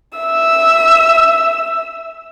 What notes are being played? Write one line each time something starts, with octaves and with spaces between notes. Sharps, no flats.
E5 E6